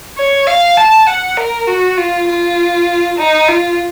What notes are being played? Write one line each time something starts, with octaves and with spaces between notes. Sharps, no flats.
C#5
F5
A5
F#5
A#4
F#4
F4
F4
D#4
F4